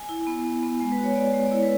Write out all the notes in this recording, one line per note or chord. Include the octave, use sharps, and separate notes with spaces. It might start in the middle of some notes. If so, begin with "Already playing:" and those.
Already playing: G#5
E4
B3
E4
B3
G#3 G#5
B4
F#4
C#5
B3 D5
G#3
D5
E4 C#5
B4